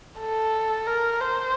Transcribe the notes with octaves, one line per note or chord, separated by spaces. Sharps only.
A4
A#4
C5